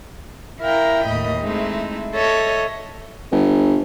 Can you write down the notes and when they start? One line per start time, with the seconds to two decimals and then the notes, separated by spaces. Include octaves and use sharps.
0.60 E4 A#4 F5 G5 A#5
1.03 D#2 A2 D#5 B5
1.41 G#3 A3 C4 D#4 E4
2.14 A4 C#5 D#5 E5
3.32 G1